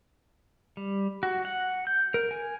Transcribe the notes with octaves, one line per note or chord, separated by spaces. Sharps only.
G3
F#4
F#5
G6
A#4
G#5